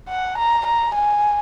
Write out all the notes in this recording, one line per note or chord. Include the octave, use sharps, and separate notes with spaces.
F#5
A#5
A#5
G#5